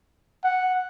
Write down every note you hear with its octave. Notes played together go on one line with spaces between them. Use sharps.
F#5